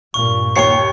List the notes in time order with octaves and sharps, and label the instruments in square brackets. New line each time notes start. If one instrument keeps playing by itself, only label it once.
[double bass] G2 A#2 [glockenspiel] C#6
[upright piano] D#2 C#5 C#7 [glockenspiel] C#6 C7